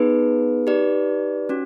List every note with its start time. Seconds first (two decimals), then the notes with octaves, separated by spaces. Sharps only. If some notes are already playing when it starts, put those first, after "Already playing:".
Already playing: B3 D#4 G#4 B4
0.66 D#4 G4 B4 D5
1.49 C#4 F#4